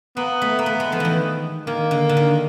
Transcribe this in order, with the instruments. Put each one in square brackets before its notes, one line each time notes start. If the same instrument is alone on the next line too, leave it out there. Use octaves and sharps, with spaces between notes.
[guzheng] A#3 [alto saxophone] B3
[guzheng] A3
A#3
A3
G#3
F3
D#3 E3
[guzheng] D#3 [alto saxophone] A#3
[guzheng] D3
D3
D#3